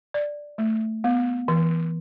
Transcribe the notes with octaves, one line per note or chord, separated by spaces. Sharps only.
D5
A3
B3
E3